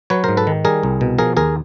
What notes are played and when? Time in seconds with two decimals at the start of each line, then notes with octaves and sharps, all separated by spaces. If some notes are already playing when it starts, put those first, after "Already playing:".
0.10 F#3 B4 C#5
0.24 G#2 A#4 C5
0.37 A4 B4
0.47 D#3
0.65 G3 G#4 A#4
0.83 C2
1.01 B2
1.18 F3 G#4 A#4
1.37 D#2 G#4 A#4